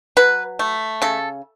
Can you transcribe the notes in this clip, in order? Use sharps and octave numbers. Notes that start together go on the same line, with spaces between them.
F#3 B4
A3
C#3 A4